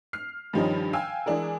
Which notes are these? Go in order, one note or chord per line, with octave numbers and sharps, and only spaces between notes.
F6 C7
G2 D#3 F3 G3 C#4 D#4
F5 G5 G#5 E6
E3 G#3 D4 G#4 A#4